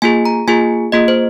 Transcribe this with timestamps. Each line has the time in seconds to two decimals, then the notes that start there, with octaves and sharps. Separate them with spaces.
0.02 A#3 F4 G#4 G#5
0.25 A#5
0.48 A#3 F4 G#4 G#5
0.92 A#3 F4 G#4 D#5
1.08 C5